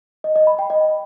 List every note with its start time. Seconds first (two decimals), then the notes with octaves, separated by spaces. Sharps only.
0.24 D#5
0.36 D#5
0.47 B5
0.59 G5
0.70 D#5